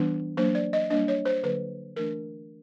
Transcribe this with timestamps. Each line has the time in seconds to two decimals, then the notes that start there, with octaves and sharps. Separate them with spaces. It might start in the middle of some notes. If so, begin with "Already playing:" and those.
Already playing: E3 G3 B3 D4
0.37 F#3 A#3 D4 C5
0.55 D5
0.73 D#5
0.90 G3 A#3 D4 D#5
1.08 C#5
1.25 C5
1.43 D3 F#3 A#3 B4
1.96 E3 A3 D4 A#4